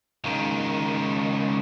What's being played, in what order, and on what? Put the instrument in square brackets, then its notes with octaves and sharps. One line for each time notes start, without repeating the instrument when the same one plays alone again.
[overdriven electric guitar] C#2 D#3